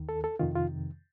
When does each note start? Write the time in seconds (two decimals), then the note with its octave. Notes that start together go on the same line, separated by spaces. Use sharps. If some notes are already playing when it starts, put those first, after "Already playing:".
Already playing: D#2 D#3
0.09 A4
0.24 A4
0.39 F2 C3 D#3 F4
0.55 F4